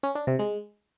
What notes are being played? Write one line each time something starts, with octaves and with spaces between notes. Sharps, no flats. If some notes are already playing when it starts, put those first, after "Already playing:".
C#4
D4
C3
G#3